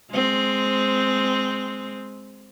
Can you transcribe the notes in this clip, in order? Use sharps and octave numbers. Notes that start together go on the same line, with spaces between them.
G#3 C4